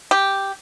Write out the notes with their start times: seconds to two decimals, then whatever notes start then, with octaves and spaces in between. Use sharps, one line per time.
0.11 G4